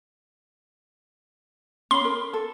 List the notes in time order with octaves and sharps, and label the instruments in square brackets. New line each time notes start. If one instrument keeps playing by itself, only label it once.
[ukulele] C#4 B5 [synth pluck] C6
[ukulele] A#4
A4